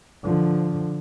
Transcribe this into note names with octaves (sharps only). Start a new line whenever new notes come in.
D3 F3